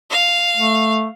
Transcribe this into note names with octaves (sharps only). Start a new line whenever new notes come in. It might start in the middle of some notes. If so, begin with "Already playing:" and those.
F5
A3